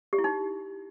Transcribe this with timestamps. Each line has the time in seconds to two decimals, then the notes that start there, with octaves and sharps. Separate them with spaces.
0.13 G4
0.18 E4
0.24 D#4